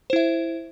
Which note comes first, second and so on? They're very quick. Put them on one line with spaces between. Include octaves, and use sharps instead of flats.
C5 E4 E5